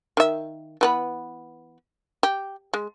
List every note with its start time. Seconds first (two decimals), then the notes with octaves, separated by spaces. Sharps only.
0.17 D#3 E5
0.81 E3 B3 B4
2.23 G4
2.74 G#3